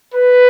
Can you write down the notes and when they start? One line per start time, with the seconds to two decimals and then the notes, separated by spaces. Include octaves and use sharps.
0.14 B4